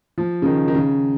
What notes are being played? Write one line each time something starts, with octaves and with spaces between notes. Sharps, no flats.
F3
C#3
D#3
D#3
C#3